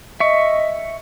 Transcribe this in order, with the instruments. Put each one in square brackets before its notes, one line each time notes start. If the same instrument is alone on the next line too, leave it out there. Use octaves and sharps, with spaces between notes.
[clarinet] D#5 [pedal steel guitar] E5 C#6